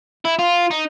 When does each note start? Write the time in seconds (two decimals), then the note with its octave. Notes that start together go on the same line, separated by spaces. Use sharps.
0.25 E4
0.39 F4
0.71 D#4